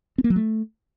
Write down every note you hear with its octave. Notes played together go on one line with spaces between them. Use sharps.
C4
A#3
F#3
A3